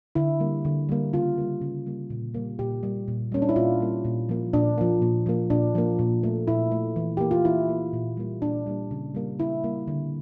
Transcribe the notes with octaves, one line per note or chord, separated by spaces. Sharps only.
D3 E4
G3 A#3
D3
G3 A#3
C#3 F4
G3 A#3
C#3
G3 A#3
A#2
G3 A#3
A#2 G4
G3 A#3
A#2
G3 A#3 C#4
D4
E4
A#2 F4
G3 A#3
A#2
F3 A#3
A#2 D4
F3 A#3
A#2
F3 A#3
A#2 D4
F3 A#3
A#2
A3
A#2 E4
A3
E3
A#3 G4
F4
E3 E4
A#3
A#2
G3 A#3
A#2 D4
G3 A#3
C#3
G3 A#3
C#3 E4
G3 A#3
D3